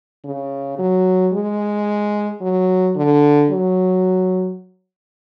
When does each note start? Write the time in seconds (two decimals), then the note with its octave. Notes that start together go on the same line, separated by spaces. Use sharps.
0.25 C#3
0.78 F#3
1.33 G#3
2.41 F#3
2.96 D3
3.51 F#3